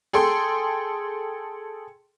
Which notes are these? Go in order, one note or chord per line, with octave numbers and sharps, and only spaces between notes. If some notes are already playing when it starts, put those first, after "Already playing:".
G#4 A4 G5 C6